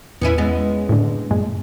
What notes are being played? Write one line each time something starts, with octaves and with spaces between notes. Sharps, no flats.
E2 B3 C#4 E4 D#7
G#3 B3 C#4
A2 D3
G2 A#2 G#3